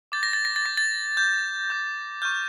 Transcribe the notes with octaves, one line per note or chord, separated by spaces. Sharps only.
D6 G6 A6
A#6
A6
A#6
A6
D6 G6 A#6
A6
D6 G6
D6 G6
C#6 F6 G6